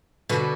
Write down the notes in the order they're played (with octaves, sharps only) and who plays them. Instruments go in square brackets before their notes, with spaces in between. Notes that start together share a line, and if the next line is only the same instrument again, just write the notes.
[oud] B2 D3